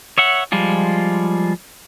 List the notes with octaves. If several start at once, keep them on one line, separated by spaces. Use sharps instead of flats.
C#5 E5 F#5
F3 G3 G#3 F4